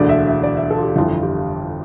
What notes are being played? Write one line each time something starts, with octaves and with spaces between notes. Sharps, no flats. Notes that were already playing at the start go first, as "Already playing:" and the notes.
Already playing: E1 D2 D3 D5
E5
E5
D5
E5
A4
F4
G4
G1 F2 E3 F4
G4